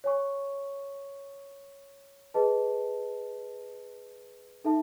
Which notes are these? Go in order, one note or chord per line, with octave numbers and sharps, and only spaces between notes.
C#5 G#5 C#6
G#4 B4 D#5 A5
D#4 A4 E5 A5